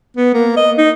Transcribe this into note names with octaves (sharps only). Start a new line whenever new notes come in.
B3
A#3
D#5
D#4